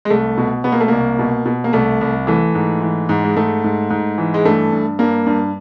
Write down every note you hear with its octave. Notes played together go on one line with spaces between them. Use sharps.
G#3
C2 A3
B2
B2 B3
A#3
A3
C2 A#3
B2
B2
A#3
C2 A3
C2
E3 A3
G#2
E3
G#2
G#3
G#2 A3
G#2
G#2
E3
G#3
G2 A3
G2
G2 A#3
G2